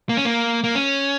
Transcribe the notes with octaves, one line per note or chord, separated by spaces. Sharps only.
A#3
C#4
A#3
A#3
C#4